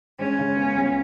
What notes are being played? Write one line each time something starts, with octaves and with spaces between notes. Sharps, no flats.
G#3 C#4
C#3
B3
C#2